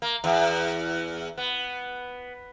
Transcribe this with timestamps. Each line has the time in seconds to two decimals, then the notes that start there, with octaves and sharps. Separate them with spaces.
0.02 A#3
0.24 E2
1.38 B3